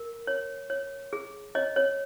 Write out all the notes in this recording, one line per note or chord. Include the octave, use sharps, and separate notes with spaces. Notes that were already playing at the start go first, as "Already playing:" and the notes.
Already playing: A#4
C#5
C#5
G#4
C#5 D#5
C#5